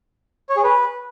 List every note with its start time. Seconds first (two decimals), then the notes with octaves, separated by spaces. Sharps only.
0.50 C#5
0.57 G#4
0.64 B4